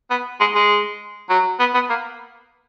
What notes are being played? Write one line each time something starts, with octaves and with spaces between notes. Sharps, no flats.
B3
G#3
G#3
F#3
B3
B3
A#3